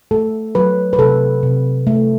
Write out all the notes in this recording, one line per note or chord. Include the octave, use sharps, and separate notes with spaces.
A3 A4
F#3 B4
B4
C3 A4
C3
A3